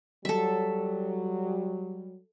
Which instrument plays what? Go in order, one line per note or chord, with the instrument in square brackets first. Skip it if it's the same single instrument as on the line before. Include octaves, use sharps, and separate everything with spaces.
[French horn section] F#3 G3 [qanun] A4 E5